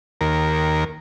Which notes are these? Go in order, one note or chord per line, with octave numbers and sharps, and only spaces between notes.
D#2 A#4